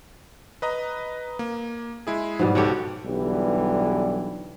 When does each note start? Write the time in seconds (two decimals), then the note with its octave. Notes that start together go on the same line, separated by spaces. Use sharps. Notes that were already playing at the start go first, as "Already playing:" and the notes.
0.62 B4 D#5 A#5
1.39 A#3
2.07 G#3 E4 G#4
2.39 G#2 B2 G3
2.55 C#2 G4 A4 C#5 F#5
3.05 B1 D3 E3 G3